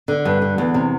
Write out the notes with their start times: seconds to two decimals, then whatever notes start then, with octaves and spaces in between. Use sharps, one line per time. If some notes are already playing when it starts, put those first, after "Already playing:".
0.08 D3
0.25 G2
0.42 D3
0.58 E2
0.74 C3